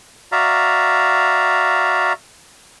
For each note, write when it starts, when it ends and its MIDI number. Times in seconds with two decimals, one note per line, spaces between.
0.32 2.13 66
0.32 2.13 74
0.32 2.13 76
0.32 2.13 77
0.32 2.13 82